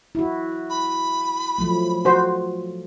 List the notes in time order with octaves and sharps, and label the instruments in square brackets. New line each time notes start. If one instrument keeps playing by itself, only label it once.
[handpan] E4 F#4
[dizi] B5
[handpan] F3 F#3 A3
[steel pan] F#4 C5